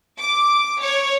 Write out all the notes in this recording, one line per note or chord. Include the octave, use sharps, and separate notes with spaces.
D6
C#5